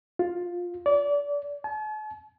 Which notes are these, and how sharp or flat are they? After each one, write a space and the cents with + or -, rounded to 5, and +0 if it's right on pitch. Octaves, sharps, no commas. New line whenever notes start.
F4 +10
D5 -30
A5 -45